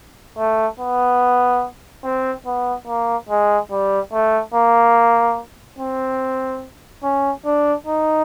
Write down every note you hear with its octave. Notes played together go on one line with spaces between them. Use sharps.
A3
B3
C4
B3
A#3
G#3
G3
A3
A#3
C4
C#4
D4
D#4